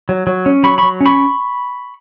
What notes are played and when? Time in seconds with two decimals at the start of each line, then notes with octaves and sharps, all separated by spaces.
0.09 F#3
0.27 F#3
0.46 C#4
0.63 F#3 B5 C#6
0.78 F#3 B5 C#6
1.01 C#4
1.06 B5 C#6